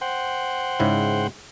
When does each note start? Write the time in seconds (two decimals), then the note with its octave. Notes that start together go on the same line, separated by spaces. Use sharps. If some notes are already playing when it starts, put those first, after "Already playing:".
0.01 C5 F#5 G5
0.80 G#2 C#3 E4